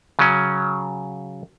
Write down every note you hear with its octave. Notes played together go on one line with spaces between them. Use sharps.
C#3 F#3 C#4